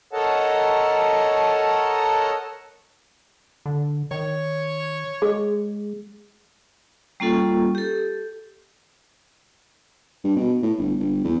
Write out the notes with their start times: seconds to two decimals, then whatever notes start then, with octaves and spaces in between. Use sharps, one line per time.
0.13 A4 A#4 C#5 D#5 F#5 A5
3.66 D3
4.11 D#3 C#5
5.22 G#3 G#4
7.20 G3 A#3 C#4 F4 A4 C#6
7.75 G4 A4
10.24 G2
10.36 B2
10.63 A2
10.78 G1
11.00 G1
11.24 E2